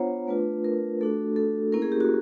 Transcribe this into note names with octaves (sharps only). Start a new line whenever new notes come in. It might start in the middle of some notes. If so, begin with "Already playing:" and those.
Already playing: B3 D4 F4 C5 C#5 F#5 A#5
A3 D4 F4 B4
A#4
A3 D4 F#4 A4
A4
A#3 C#4 E4 A#4
G#4
G4
F#4